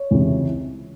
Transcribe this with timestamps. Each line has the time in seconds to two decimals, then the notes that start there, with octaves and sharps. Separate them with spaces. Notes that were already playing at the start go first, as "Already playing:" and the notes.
Already playing: C#5
0.11 C#2 C3 E3